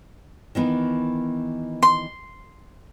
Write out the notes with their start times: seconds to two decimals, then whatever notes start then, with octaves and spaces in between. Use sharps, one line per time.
0.55 D#3 E3 B3
1.83 C6